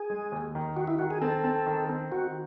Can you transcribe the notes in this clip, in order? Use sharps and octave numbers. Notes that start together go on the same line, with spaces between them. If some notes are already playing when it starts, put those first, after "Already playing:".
Already playing: G#4
G#3
D#2
D#3
D#3 F#4
E4
D#3 F#4
G#4
C4 A4
C4
D#3
C4
D#3 F#4